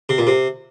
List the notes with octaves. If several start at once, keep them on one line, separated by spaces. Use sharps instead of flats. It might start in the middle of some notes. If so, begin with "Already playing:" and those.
C3
A#2
C3